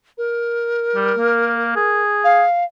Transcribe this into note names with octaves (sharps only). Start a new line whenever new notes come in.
A#4
G3
A#3
G#4
F5